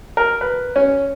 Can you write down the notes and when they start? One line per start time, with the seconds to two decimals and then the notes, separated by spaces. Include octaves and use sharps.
0.17 A#4
0.41 B4
0.76 C#4